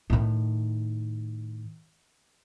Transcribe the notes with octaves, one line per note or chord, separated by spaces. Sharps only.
A2 D#3